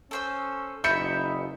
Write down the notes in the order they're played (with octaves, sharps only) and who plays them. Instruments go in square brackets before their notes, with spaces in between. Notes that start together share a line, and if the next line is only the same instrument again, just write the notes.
[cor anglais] C#4 [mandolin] A4 C5 E6
[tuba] F#1 [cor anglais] D#4 [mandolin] E5 B5 [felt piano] G6 C#7